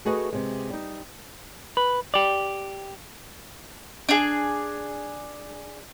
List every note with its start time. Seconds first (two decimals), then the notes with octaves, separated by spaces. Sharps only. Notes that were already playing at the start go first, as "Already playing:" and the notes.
0.05 A3 F#4 G#4 B4 D#5
0.33 C3 G#3
0.70 G3 D#4
1.77 B4
2.14 G4 D5
4.09 D4 G#4